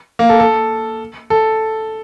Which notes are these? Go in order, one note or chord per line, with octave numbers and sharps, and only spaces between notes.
A#3
A4
A4
A4